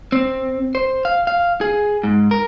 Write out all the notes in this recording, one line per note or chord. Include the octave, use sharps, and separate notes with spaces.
C4
C5
F5
F5
G#4
G#2
A#4